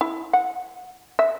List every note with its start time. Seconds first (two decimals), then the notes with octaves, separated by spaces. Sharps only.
0.01 E4
0.33 F#5
1.19 E5